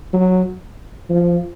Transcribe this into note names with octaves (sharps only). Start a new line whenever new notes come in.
F#3
F3